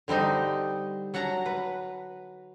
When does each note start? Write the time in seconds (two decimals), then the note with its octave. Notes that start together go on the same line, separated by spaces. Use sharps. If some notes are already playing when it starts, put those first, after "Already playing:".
0.08 D3 G3 C4 D#4
1.14 F#3 F#5 A5 A#5
1.46 B4